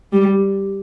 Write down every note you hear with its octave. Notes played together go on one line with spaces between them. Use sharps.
G3